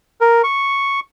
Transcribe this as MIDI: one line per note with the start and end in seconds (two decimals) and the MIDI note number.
0.21 0.42 70
0.44 1.00 85